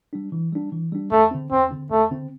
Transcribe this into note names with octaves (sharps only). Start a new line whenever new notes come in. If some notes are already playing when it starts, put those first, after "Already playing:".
G3 D4
E3
G3 D4
E3
G3 D4
E2 A3
D3 C4
E2 C4
D3 C4
E2 A3
D3 C4